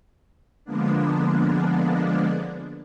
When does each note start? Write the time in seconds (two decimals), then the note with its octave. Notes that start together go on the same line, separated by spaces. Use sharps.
0.64 D3 F3 G#3 A#3 B3 D4